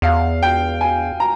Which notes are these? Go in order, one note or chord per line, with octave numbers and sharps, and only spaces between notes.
E2 F5
G5
G#5
A#5